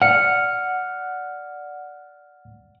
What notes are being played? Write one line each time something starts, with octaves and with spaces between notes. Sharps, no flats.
D5 F#5 F6 C#7